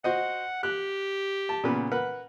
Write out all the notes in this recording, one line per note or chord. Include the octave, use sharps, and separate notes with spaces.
F#4 C5 D#5 F#5
G4 F#6
A5
A#2 C#3 B3
A#4 B4 F#5